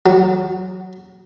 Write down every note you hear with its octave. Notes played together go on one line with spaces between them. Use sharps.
F#3